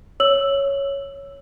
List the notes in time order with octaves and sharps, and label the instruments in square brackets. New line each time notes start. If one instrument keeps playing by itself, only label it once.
[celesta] C#5 E6 F#7